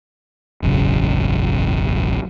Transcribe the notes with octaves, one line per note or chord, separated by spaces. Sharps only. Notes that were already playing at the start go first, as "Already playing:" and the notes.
E1 A1 F#2 C#3